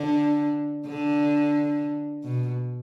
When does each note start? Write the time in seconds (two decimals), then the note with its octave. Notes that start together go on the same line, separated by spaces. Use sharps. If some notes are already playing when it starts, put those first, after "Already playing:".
Already playing: D3
0.87 D3
2.24 B2